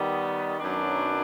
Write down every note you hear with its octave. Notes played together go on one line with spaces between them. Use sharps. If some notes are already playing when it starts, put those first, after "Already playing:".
Already playing: D#3 G3 B3
F#2 D#3 F#3 B3 D4